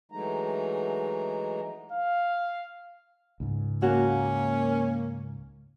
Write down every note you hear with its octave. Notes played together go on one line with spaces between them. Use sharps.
E3 F#3 G#3 A3 D#4 A#5
F5
C#2 G#2
A#3 C#4 F#4